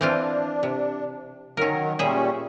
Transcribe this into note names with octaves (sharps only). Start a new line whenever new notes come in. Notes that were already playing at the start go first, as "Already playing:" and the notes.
E3 C4 D4 F4
C3
D#3 F#3 C#4 A#4
A#2 G3 C#4 G#4 E5